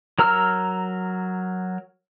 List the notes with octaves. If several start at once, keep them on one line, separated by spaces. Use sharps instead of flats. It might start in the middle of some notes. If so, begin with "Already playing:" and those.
F#3 A#4 A#5 E6 F6